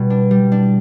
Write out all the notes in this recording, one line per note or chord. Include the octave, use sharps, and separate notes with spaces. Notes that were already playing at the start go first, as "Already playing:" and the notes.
Already playing: B2 G3
D4
G3
D4